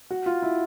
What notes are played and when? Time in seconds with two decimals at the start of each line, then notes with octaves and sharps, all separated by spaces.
0.11 F#4
0.26 F4
0.42 E4